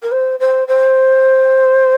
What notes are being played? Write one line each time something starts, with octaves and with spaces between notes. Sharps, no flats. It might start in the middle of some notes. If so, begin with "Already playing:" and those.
A#4
C5
C5
C5